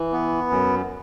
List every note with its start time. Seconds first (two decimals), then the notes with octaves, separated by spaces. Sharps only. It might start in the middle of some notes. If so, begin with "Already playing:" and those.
Already playing: E3
0.12 B3
0.50 F#2